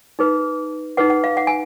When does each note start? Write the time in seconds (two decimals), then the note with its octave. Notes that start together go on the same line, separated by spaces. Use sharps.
0.19 D#4 G#4 B4
0.97 D#4 G#4 B4 F#5
1.10 F#5
1.24 F5
1.37 F#5
1.47 G#5